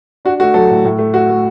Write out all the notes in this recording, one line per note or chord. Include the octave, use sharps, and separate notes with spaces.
D4 F#4
A3 F#4
F#3 A4
A2
A2
A3
A3 F#4
A3